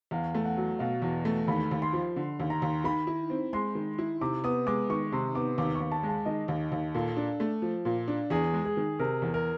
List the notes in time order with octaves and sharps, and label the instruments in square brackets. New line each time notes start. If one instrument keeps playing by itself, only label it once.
[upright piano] E2 [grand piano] F5
[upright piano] A3
[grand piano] F#5
[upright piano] F#3
[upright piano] B2 [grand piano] F5
[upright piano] E2
A3
[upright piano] D#2 [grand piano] B5
[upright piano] D#2
[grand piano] C6
[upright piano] F3
D3
D#2
[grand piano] A#5
[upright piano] D#2
[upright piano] D#3 [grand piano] B5
[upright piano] E4
C4
[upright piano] G#3 [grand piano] C6
[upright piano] D#3
E4
[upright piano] C3 [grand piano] D6
[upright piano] B3 [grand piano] D#6
[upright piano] G#3 [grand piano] D6
[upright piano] D#3 [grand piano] C#6
[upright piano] C3 [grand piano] C6
[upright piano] B3 [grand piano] D6
[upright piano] D#2 [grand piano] D6
[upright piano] D#2 [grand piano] C#6
[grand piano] A5
[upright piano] G#3
[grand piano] A5
[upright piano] D#3 [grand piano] D#5
[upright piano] D#2
D#2
[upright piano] A#2 [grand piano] A4
[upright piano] D4
A3
F3
A#2
D4
[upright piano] E2 [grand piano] G#4
[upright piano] G#3
[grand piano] G#4
[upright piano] D#3
[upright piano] C3 [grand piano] A#4
[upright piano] E2
[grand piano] A#4